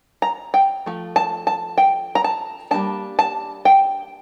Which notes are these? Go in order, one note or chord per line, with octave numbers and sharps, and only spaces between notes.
A#5
G5
F3 A3
A5
A5
G5
A#5
A5
G3 A#3 D4 A5
A5
G5